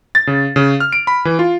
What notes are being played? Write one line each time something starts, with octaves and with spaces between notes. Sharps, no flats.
A6
C#3
C#3
F6
D7
B5
E3
F4